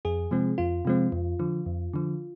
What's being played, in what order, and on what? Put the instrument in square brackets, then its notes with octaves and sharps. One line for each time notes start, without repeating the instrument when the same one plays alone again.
[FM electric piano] F2 G#4
C3 F3 G#3 C4
F2 F4
C3 F3 G#3 C4
F2
D3 F3
F2
D3 F3